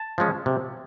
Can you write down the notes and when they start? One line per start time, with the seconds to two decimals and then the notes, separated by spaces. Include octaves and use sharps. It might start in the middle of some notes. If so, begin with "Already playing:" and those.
Already playing: A5
0.18 F3 G#3 C#4
0.46 C3